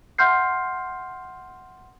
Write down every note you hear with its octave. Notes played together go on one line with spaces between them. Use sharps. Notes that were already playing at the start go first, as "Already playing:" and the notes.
E5 F#5 C6 F6 G6 C7